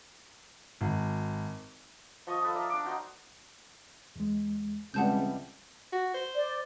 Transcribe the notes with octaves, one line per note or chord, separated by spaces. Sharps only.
G#1
F3 D#5 C#6 D#6
A4 B4 F5 A5
A#4 D5 E5
D4 D6
D#4 F#4 C5
E2 G#3
C#2 E3 G3 G#3 C4 F#5 A5 G6
F#4
C5
D5